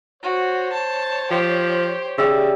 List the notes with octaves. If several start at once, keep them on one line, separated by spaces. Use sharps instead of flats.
F#4 C5 C#5
A5
F3 G4
C#3 G4 D5 E5